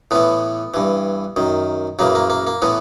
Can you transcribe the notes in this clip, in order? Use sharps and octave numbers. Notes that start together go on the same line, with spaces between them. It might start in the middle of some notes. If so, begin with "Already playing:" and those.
A2 E3 B3
G2 E3
F#2 D#3
F#2 C#3 E3 A#3
A#3
A#3
A#3
A2 E3 B3